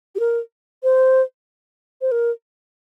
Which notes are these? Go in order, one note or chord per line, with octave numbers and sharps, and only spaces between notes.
G4
A#4
C5
C5
A#4